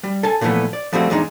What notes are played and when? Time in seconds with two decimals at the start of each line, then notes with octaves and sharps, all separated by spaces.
0.03 G3
0.23 A4 G#5 A5
0.41 A#2 D3 E3 F3 A3 B3
0.73 D5
0.93 F3 G3 A3 C4 F#4
1.10 E2 G#3 D4 D#4